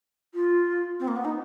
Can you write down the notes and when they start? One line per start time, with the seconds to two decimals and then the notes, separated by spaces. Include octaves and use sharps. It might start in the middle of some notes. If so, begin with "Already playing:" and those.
0.34 F4
0.99 C4
1.07 A#3
1.16 B3
1.24 D#4